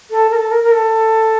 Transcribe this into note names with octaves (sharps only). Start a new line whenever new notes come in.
A4
A#4
A4
A#4
A#4
A4